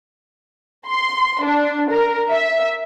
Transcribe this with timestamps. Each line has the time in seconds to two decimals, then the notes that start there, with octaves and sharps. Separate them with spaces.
0.87 C6
1.42 D4
1.91 A#4
2.30 E5